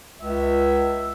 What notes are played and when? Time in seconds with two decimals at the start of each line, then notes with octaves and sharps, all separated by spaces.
0.21 C#2 E5